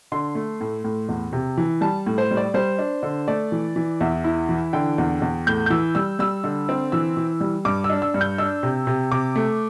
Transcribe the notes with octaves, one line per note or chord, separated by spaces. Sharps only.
D3 C6
A3
A2
A2
E2
C3
E3
G3 A5
A2
C5
G3
D5
G3 C5
D4
D3
A3 D5
E3
E3
E2 E5
E4
E3
D3 G5
E2
E2
A2 G6
G6
E3 E6
G3 E6
G3 E6
D3
C4
E3 E6
E3
G3
G2 D6
E6
D4
E6
G2
G6
D4 E6
C3
C3
C3 D6
A3